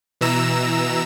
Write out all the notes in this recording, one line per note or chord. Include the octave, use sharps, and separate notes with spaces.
B2 E3 A#5 E6 E7